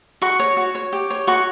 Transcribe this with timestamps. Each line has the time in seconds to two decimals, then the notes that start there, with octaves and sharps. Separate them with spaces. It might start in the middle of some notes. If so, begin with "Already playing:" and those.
0.22 F#4 C#6
0.40 C#5
0.57 F#4
0.75 C#5
0.93 G4
1.10 C#5
1.27 F#4 C#6